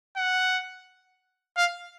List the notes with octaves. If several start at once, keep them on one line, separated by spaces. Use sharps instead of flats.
F#5
F5